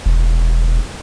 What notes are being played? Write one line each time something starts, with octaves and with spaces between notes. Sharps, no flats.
E1